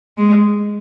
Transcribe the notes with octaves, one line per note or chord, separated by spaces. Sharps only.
G#3